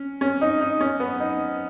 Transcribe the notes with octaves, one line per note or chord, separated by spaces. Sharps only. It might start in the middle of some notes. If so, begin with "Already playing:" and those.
Already playing: C#4
C#4
D#4
D#4
C#4
B3
D#4